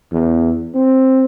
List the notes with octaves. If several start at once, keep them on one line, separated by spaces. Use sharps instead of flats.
E2
C4